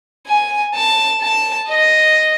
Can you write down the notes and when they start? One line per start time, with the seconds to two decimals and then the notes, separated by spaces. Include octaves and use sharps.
0.27 G#5
0.75 A5
1.22 A5
1.69 D#5